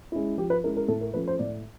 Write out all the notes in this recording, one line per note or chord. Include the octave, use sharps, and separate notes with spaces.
G#3 C#4 E4
F3 G4
B4
G#3 C#4 E4 A#4
A#4
A2 A4
A#4
F3 A3 C#4 B4
C5
A2 D5